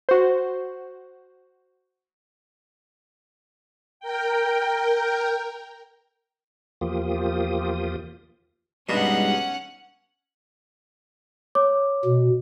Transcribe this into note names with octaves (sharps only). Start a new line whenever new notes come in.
F#4 C5
A#4 G5
E2 F3 A#3 F4 G4 D#6
G2 B2 G3 G#3 C#4 D#4 F#5
C#5 D6
B2